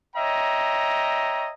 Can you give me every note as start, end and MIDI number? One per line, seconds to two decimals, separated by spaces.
0.16 1.51 73
0.16 1.51 75
0.16 1.51 76
0.16 1.51 79
0.16 1.51 82